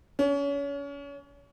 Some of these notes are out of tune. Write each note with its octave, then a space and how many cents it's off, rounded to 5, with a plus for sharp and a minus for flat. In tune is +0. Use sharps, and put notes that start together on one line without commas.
C#4 +30